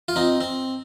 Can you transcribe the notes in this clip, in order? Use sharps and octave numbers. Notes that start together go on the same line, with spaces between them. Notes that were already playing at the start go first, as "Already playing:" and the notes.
F4
C4 D#4
C4